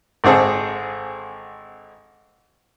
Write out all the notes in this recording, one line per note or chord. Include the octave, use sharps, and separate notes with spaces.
G#1 D3 C4 G#4 A4